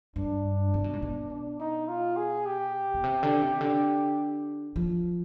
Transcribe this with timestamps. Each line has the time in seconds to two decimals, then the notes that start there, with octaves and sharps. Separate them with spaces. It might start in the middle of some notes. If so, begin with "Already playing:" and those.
0.16 G2 D4
0.74 C3
0.84 B2
0.93 G#2
1.02 B2
1.31 D4
1.60 D#4
1.88 F4
2.17 G#4
2.46 G4
2.94 B2
3.04 C3
3.23 D3
3.42 C3
3.61 D3
4.76 F3